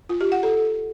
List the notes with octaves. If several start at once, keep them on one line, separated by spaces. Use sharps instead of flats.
F4
G4
F#5
A4